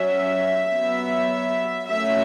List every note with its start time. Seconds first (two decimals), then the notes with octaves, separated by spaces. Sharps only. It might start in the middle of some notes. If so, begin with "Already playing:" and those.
Already playing: F#3 C#4 E5
0.72 F#3 B3
1.88 F#3 A3 C#4 E5